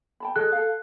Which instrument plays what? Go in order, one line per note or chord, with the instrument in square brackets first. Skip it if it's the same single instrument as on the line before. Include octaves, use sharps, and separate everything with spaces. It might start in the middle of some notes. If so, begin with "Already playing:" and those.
[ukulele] G5 A5 B5
[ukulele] G#4 A4 D#5 [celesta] F#6
[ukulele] A4 F5